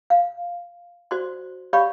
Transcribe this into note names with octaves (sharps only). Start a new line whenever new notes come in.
F5
F#4 C5 D5 C6
G4 C#5 D5 F5 B5 C#6